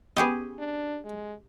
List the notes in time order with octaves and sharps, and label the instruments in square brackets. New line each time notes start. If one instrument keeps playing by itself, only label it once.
[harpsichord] B3 D#4 [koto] C#4 G4 G#4
[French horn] D4
G#3